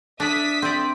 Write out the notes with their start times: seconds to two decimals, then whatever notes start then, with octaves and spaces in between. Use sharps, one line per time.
0.20 D4 D5 E5 D#6 B6
0.62 C4 D5